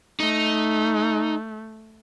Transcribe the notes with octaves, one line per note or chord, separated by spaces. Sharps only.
A3 D#4